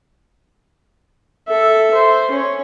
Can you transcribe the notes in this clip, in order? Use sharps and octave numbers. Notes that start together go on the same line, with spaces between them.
A4 E5
C5
C#4 C#5